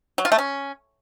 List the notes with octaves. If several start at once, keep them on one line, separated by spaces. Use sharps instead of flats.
F#3
F4
A3
C#4